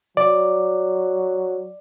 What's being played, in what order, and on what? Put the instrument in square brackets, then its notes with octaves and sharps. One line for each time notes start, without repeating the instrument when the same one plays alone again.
[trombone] F#3 [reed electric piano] D5